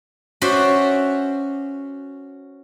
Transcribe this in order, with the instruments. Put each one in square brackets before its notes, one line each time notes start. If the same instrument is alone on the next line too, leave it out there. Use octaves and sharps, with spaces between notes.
[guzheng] C#4 F#4 C5 D5 E5